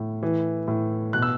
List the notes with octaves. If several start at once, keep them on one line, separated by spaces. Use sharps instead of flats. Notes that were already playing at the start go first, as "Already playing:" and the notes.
Already playing: A2
E3
A2
B2 F#6
E6